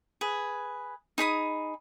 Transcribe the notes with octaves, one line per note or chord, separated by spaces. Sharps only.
G#4 B4
D#4 G#4 B5 D#6